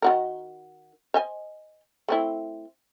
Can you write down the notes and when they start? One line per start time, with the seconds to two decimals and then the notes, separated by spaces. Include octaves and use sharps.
0.02 D#3 F#4 A#4
1.14 C5 D#5 G#5
2.08 A3 C4 E4